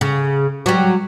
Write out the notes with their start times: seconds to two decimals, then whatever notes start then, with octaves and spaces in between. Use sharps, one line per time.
0.01 C#3
0.66 F#3 G3